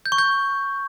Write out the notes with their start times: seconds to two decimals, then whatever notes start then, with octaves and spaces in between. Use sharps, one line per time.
0.06 G6
0.12 C#6
0.18 G6